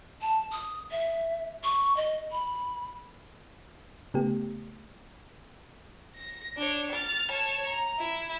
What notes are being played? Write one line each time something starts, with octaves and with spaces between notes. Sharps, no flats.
A5
D#6
E5
C#6
D#5
B5
C#3 A3 B3 G4
A#6
D4 C#5
F6 A6
C#5 A5
A#5
E4